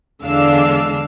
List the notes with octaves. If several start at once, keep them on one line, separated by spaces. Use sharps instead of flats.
E2 D3 G#3 D4 F5 E6